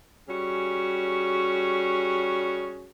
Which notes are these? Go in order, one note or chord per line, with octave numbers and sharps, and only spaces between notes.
G3 C#4 F#4 G#4